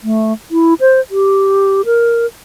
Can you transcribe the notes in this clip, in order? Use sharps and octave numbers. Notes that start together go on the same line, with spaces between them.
A3
E4
C5
G4
A#4